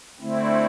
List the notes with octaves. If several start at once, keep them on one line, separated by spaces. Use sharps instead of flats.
D3 A3 C4 E4